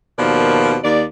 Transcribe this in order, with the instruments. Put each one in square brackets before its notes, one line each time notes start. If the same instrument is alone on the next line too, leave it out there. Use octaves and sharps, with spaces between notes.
[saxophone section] D#2 B2 F3 A#4 D5
D#2 D5